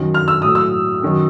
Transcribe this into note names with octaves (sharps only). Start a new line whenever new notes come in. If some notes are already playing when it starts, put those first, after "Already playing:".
Already playing: F#2 D#3 F#3
F6
E6
A2 F#3 D#6
E6
F#2 D#3 F#3